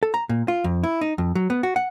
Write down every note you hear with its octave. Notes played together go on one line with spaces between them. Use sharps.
A4
A#5
A#2
F4
F2
E4
D#4
F2
F#3
B3
F#4
F#5